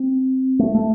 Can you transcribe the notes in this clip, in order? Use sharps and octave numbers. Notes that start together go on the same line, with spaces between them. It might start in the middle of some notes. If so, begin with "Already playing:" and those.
Already playing: C4
A3
A3